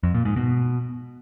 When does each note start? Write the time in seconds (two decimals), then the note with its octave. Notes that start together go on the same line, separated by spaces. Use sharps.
0.03 F2
0.14 A#2
0.25 G#2
0.36 B2